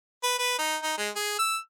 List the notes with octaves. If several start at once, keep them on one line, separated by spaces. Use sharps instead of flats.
B4
B4
D#4
D#4
G#3
G#4
E6